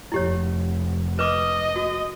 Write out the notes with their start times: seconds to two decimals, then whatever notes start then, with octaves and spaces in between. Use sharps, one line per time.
0.12 F1 E4 G4 C#5
1.19 B4 D#5 D6
1.76 F#4